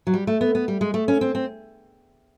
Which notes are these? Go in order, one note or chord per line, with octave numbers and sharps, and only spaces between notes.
F#3
G3
A3
B3
B3
G3
G#3
A3
C#4
C4
C4